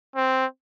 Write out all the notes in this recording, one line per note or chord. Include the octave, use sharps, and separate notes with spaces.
C4